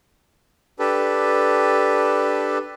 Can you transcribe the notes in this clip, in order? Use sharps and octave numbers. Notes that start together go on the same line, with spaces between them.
D4 G4 A4 B4